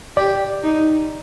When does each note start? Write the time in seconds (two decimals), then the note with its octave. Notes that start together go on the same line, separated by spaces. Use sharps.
0.17 G4 D5
0.63 D#4